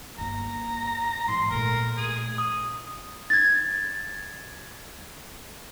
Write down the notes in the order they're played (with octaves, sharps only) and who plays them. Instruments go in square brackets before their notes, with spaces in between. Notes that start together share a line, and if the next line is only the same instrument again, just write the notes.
[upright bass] G1 A#3 [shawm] A#5
[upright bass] G#2 E3 [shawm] C6
[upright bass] A#2 A3 [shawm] A#4
[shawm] G#4
[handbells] D#6
[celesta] G#6 A6